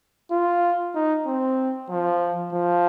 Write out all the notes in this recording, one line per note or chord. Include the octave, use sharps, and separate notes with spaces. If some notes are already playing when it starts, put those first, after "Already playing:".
F4
D#4
C4
F3
F3